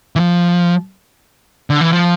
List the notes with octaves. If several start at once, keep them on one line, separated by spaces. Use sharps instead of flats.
E3
F3
D3
E3
F3